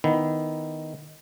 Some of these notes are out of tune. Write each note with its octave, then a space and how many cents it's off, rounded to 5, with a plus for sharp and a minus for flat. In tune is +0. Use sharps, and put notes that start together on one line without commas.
D#3 +0 B3 +0 E4 +0